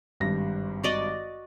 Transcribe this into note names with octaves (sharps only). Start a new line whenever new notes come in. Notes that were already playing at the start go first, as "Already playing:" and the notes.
G#1 G2 A#6
F#4 D5 D#5